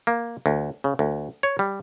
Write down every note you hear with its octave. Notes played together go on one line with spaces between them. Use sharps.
A#3
D2
C#3
D2
C#5
G3